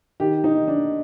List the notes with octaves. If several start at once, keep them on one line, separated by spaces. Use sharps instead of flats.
D#3 G4
D#4
D#3
D4